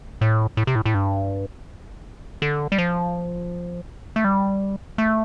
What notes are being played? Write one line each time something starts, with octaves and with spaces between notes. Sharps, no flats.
A2
A2
C3
A2
A2
G2
D3
G3
F3
A3
G3
A3